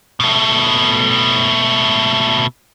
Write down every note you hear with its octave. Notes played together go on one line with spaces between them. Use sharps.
B2 A3